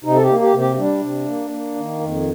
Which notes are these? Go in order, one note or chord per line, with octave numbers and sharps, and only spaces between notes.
C3 D#4
A4
G4
A#3
G4
C3
G4
G3 D4
C3
A#3
A#3
D#3
F2